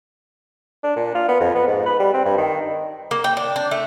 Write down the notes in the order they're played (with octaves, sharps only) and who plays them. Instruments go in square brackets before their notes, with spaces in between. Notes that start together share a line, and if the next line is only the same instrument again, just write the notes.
[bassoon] D4
A#2
F4
B3
F2
B3
G#2
B4
G3
C4
G2
D#3
[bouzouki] A#3
G5
D4
D4
A3